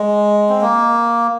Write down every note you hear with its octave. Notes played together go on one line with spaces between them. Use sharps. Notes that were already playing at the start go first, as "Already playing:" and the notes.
Already playing: G#3
C4
A#3